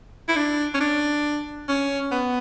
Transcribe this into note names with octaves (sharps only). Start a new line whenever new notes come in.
E4
D4
C#4
D4
C#4
B3